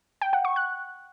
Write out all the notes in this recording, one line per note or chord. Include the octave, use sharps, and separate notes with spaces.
G5
F#5
C#6
F#6